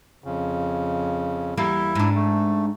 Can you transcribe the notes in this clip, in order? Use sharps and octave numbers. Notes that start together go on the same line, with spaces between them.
F2 C#3
E2 G3 A#3 E4
G#2 D4
A3